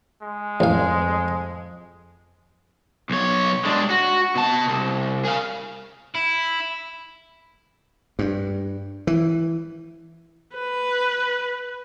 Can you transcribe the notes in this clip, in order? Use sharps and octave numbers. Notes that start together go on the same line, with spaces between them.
G#3
A1 F2 F5
B1 C#5
G#3 D4
F#4
B2 A5
C2
G#4 F5
E4
G2
E3
B4